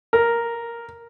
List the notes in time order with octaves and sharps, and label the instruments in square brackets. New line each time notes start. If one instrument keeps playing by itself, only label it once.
[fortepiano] A#4